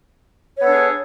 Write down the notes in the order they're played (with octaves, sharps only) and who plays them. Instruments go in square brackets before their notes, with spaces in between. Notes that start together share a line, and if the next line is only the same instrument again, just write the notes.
[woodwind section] C#5
B3
A4
D4
G#4